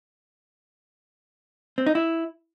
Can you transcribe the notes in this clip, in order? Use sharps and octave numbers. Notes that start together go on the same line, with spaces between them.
C4
D#4
E4